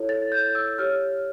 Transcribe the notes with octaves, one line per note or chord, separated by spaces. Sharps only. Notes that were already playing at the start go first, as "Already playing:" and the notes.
Already playing: E4 A4 C#5
A6
G6
E6
G4 C#5 F6